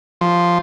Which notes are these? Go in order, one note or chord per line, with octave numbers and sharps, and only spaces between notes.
F3